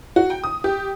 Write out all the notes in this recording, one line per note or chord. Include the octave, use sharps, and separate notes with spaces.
F#4
G5
D#6
G4